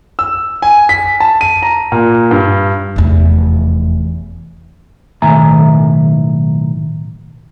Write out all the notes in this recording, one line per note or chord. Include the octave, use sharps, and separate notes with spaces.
E6
G#5
B6
A5
D#7
A#5
A#2
G2
F1 E2
B1 A2 D#3 E5 G#5 A#5